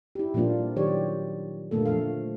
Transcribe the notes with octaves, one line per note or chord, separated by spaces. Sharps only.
E4 G4
A#2 F3 G3 A#3 D4 F4
D#3 F#3 G4 C#5 D5
A#2 D3 A3 A#3 A4
F3 A3 A4 F5